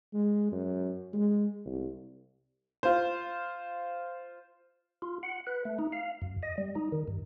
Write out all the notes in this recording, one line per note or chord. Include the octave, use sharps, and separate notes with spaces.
G#3
F#2
G#3
C2
F4 C5
F4
F#5
B4
A3
D#4
F5
F#2
D#5
G3
D#4
D#3
G2